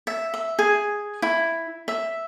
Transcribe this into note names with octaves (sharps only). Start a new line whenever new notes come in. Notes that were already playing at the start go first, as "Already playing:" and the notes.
E5
E5
G#4
E4
E5